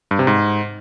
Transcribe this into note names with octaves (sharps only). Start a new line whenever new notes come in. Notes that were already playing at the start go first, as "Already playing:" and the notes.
G2
C3
G#2